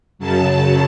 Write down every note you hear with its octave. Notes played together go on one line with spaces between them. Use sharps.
F#2 C#3 F#3 A5